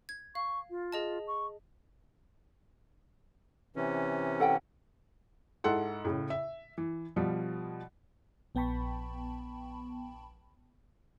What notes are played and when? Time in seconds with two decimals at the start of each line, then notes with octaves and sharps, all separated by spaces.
0.09 G#6
0.35 F5 C#6
0.70 F4
0.92 G#4 D#5 A5
1.27 C#6
3.76 C3 E3 C#4
4.40 A4 F#5 G5
5.64 G#2 E4 A4 F#5 C6
6.04 A2 C#3
6.30 E5
6.78 E3
7.16 B2 F3 G3
8.55 A#1 B3 G5 A5 B5 C#6